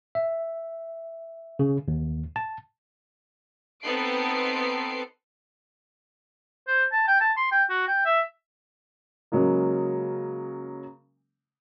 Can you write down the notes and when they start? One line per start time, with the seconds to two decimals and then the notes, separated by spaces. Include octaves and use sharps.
0.15 E5
1.59 C#3
1.88 D#2
2.36 A5
3.83 B3 C4 D#4 A4 C7 D7
6.67 C5
6.92 A5
7.07 G5
7.21 A5
7.37 C6
7.52 G5
7.69 F#4
7.88 G5
8.05 E5
9.32 C#3 F#3 G#3 A#3